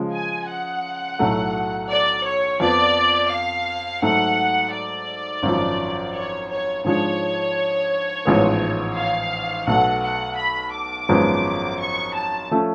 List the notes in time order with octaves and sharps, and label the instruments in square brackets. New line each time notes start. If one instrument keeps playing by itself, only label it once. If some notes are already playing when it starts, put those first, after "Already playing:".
Already playing: [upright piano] C#3 F3 G#3
[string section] G#5
F#5
[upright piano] B1 A2 F#3 A3
[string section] D5
C#5
[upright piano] F2 F3 B3 [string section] D5
[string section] F5
[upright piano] G#2 F#3 A3 [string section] F#5
[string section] D5
[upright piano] G#1 F#2 F3
[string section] C#5
C#5
[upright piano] G#2 F3 G#3 D4 [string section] C#5
[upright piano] A1 G#2 F3 G#3 B3
[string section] F5
[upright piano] B1 B2 A3 [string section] F#5
[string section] F#5
B5
D6
[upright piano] G#1 F#2 F3 G#3 B3
[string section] C#6
A5
[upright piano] F3 A3 C#4